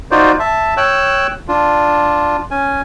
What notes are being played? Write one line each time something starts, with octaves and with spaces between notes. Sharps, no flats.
D#4 F4 F#4 C5 D5
E5 A5
C#5 G5 E6 F#6
D4 F4
C#4 G#5